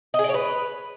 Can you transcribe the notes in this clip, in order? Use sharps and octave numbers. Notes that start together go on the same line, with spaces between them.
D#5
G#4
D5
C#5
B4